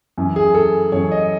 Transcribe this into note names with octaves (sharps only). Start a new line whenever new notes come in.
F#2 E3
G#4
A4
F#2 E3 C#5
D#5